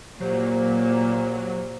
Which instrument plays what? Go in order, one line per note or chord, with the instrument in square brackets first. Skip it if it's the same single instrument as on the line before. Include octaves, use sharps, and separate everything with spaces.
[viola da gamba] A#2 A#3 [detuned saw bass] F#3 [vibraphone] G4 C5